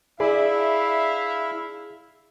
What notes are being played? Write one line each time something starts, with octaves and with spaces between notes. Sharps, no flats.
D4 E4 G#4 D5 E5 F5 B5